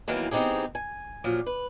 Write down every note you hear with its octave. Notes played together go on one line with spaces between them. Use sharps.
E2 D#3 E3 F#3 A#3
E3 B3 C4 D#4 G4 G#4
G#5
A#2 F3 F#3
B4